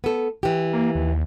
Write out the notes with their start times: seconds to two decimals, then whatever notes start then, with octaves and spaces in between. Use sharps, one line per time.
0.04 B3 A4
0.43 E3 G4
0.73 A#3
0.95 D#2